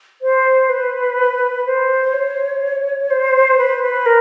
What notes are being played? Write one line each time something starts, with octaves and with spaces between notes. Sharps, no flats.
C5
B4
C5
C#5
C5
B4
B4
A#4